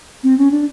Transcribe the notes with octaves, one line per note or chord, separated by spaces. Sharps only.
C4
C#4
D4